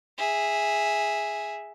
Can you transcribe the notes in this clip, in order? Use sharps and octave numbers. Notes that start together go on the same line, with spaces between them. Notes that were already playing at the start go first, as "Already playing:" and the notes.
G#4 E5